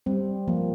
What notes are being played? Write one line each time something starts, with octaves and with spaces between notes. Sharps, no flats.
G3 C4
F3 A#3